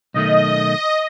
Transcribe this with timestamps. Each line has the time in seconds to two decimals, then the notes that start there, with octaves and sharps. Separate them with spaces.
0.14 B1 D#3 A3 D#5